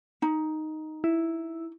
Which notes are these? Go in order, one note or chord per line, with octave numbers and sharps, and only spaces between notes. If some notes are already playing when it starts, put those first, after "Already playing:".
D#4
E4